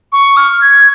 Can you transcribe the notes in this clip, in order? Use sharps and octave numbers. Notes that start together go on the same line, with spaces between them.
C#6
F6
G#6